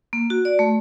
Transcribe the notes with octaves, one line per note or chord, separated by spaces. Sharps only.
A#3
F#4
D5
A3